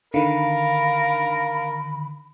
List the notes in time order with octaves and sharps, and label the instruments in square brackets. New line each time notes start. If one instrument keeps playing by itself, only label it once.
[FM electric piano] D3 D#3 [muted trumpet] A#4 [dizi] F5 [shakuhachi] B5